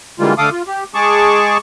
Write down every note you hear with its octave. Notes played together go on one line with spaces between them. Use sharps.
D3 E3 G3 G#3 A#3 F4
D3 A3 A4 F5 D6 D#6
F4
G4
G#3 G#4 A5 C#6 D6